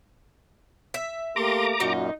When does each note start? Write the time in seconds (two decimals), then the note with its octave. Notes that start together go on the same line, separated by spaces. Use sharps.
0.94 E5
1.36 A3 A#3 G4 A#5 C6 D6
1.80 F#2 A#2 D#4 F#4